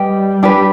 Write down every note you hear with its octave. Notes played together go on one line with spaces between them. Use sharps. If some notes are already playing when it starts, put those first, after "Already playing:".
Already playing: G3 G4 B4 D#5 G5
D4 G4 B4